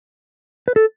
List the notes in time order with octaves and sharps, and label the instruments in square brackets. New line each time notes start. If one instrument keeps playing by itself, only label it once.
[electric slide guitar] B4
A4